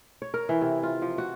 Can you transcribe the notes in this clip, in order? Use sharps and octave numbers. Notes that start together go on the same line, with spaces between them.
C#5
A#4
E3
C3
F4
F3
F#4